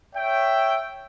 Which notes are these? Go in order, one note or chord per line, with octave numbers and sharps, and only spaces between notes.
C#5 E5 G5